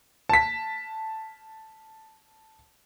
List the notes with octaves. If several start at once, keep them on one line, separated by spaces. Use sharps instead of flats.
A5 B6